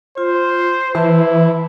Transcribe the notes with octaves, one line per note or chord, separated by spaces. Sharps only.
F4 C5
E3 E4 B4 E5 A5